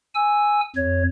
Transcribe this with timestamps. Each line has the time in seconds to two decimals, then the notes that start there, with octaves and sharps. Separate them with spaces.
0.15 G#5 E6
0.76 F2 C#5